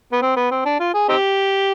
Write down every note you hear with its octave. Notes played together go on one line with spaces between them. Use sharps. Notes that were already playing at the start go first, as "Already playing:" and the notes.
B3
C4
B3
C4
D4
F4
G#4
C4 D#4 G4